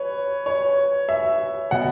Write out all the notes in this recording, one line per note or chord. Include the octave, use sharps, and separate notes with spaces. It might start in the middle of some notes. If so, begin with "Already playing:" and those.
Already playing: B4 C#5
C#5
E5
B2 F#5